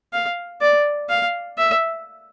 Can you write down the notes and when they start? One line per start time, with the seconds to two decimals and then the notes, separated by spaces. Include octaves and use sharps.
0.13 F5
0.61 D5
1.09 F5
1.58 E5